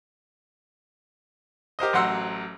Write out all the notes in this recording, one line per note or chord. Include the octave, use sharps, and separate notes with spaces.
G4 A#4 C5 D#5
A1 F#3 F#5 C6 E6